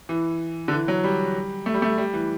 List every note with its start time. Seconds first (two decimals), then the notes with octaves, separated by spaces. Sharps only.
0.09 E3
0.68 D3
0.72 E3
0.88 F#3
1.04 G3
1.66 A3
1.74 G3
1.82 A3
1.98 G3
2.13 E3